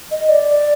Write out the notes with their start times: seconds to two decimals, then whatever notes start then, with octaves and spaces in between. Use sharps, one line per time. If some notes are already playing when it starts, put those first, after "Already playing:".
0.11 D#5
0.29 D5